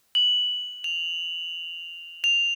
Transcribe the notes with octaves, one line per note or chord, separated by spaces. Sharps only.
F#7
F7
F7